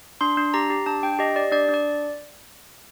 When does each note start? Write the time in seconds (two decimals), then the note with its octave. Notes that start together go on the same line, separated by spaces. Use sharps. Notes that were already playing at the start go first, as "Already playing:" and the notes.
0.21 D4 C6
0.37 D4
0.54 G4 A#5
0.70 G4
0.86 D4 A5
1.03 D4 G5
1.19 G4 D#5
1.36 G4 D5
1.52 D4 D5
1.69 D4 D5